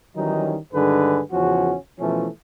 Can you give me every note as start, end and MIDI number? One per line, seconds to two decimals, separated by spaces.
0.16 0.56 51
0.16 0.56 52
0.16 0.56 54
0.16 0.56 55
0.16 0.56 61
0.16 0.56 63
0.73 1.22 43
0.73 1.22 50
0.73 1.22 51
0.73 1.22 56
0.73 1.22 68
0.73 1.22 71
1.32 1.76 40
1.32 1.76 49
1.32 1.76 53
1.32 1.76 61
1.32 1.76 66
1.99 2.28 47
1.99 2.28 52
1.99 2.28 53
1.99 2.28 57
1.99 2.28 61